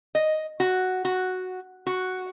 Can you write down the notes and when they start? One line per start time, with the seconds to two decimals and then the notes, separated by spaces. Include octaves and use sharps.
0.15 D#5
0.60 F#4
1.05 F#4
1.87 F#4